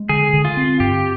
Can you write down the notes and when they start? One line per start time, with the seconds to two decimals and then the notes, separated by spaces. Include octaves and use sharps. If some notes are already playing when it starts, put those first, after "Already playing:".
Already playing: G#3
0.09 D3 G#4
0.33 D3
0.45 F4
0.57 C4
0.80 G2 G4